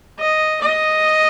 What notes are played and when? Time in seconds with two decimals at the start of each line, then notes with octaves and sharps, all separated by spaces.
0.19 D#5
0.62 D#5